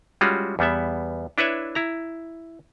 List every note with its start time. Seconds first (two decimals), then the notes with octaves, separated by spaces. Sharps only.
0.21 G3 G#3 C#4 F4 F#4
0.59 E2 G3 B3 E5
1.38 D4 E4 B4 C#5 E5
1.75 E4 A#5